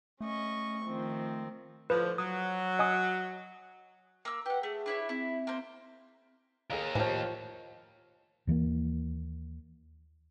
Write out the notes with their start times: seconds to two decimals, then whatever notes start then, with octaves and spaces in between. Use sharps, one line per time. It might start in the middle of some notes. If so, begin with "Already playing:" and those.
0.21 A3 C#4 D#5 C#6
0.84 D#3 F3 C4
1.90 A2 D3 F3 B4
2.18 F#3 D#6
2.79 D#5 G#5 D#6
4.25 A#3 E6
4.46 G4 B4 F#5
4.63 A3 G#4
4.86 D4 E4 C#5
5.09 C4 E4
5.47 A#3 C5
6.70 D#2 G#4 A#4 D#5 F5
6.95 A2 E3 F3 G4 C#5
8.47 D#2 E3 G3 A#3